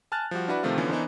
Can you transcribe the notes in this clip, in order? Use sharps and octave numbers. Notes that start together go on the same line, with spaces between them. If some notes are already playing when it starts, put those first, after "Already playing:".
G#5 A5 F6 F#6 A6
F3 G3 F#4
D4 E4 F#4 B4 D5
C3 D#3 F3 A3 C4 F4
D3 E3 F3 B3 C#4
E3 B3 D4 D#4 A#4 C5